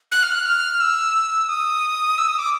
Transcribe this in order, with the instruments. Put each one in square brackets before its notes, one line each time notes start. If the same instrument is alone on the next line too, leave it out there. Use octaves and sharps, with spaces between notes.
[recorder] F#6
F6
F#6
F6
E6
D#6
E6
D#6
D6